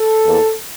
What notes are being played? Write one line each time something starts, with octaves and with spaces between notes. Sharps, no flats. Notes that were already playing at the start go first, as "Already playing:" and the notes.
Already playing: A4
E2 E3 A#3